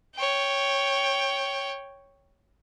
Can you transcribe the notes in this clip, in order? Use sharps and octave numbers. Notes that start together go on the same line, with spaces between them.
C#5 G5